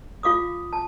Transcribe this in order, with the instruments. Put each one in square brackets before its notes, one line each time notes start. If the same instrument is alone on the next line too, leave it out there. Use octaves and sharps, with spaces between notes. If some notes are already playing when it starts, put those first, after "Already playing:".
[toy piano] F4 F5 D6 D#6
A5